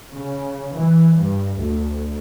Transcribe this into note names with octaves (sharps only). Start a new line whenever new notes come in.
C#3
E3
G2
D2